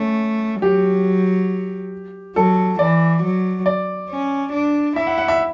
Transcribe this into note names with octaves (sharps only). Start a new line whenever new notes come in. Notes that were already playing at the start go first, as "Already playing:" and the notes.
Already playing: A3 C#4
F#3 G4
F#3 A4
E3 D5
F#3
D5
C#4
D4
E4 E5
F#5
F#5
E5